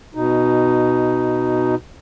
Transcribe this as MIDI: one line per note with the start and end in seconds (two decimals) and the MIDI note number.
0.15 1.75 47
0.15 1.75 63